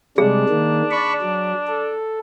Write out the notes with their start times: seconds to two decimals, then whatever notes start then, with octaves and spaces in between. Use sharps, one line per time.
0.18 C3 G3 G#3 D4 G#4
0.49 D#3 A#3
0.91 D5 B5 C#6
1.22 F#3
1.67 A4